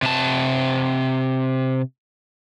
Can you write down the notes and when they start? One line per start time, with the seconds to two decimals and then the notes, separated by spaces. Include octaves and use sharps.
0.02 C3 A5